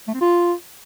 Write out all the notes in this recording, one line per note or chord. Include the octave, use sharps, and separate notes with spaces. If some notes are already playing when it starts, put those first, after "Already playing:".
A3
C4
F4